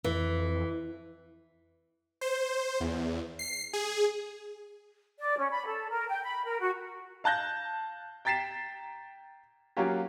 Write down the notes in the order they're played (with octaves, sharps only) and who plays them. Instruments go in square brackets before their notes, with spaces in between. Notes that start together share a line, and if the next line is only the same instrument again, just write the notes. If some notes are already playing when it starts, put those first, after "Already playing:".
[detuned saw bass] F2 [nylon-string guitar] E3
[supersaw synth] C5
E2
C7
G#4
[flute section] D5
C#4
B5
A4
A#4
G5
B5
A#4
F#4
[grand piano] F5 A5 F#6 G6 A#6
G5 A#5 A6 B6 C7 E7
F#3 A#3 C#4 F4 G4